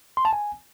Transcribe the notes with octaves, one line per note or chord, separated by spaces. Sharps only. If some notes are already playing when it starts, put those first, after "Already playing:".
C6
A5
G#5